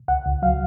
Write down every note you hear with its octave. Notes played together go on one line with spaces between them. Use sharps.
C#2 F#5
C#2
F#3 F5